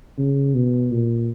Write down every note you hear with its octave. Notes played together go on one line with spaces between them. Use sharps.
C#3
B2
A#2